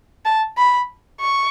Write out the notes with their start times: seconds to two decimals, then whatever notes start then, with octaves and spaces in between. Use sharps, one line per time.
0.25 A5
0.57 B5
1.21 C#6